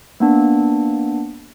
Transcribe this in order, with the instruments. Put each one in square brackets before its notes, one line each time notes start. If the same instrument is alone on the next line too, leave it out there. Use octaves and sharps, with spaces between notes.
[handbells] A#3 B3 D4